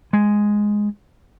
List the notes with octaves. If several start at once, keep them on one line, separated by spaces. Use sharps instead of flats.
G#3